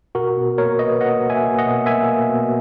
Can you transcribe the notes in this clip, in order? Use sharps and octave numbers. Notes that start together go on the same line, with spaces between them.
B2 F#4 A#4
B2
A#3 A#4 C#5
A#3 B4 D#5
A#3 D#5 F#5
A#3
E5 G#5
A#3
D#5 F#5
B2
A#3 E5 G#5
A#3
B2